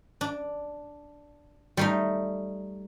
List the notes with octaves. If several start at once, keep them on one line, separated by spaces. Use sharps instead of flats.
D4
G3 A3 D#4